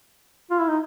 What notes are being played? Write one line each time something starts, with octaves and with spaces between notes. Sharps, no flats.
F4
E4
D#4